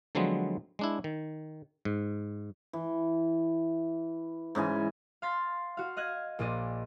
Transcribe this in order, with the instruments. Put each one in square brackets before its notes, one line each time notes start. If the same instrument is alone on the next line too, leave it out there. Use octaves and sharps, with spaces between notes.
[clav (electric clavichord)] D3 F3 F#3 G#3 B3 C4
G#3 D4 E4
D#3
G#2
[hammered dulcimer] E3
G#2 C#3 E3 G#5
[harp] F5 C6 A6 B6
F#4 F5
D#5 F6 F#6 G#6
A#1 A#2 D5 D#5